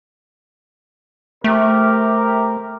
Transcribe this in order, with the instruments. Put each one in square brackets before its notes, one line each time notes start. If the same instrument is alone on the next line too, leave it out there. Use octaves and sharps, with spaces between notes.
[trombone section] C3 G4 A#4 [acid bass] A3